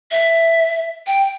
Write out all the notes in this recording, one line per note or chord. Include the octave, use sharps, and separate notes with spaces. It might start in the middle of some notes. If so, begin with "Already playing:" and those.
E5
G5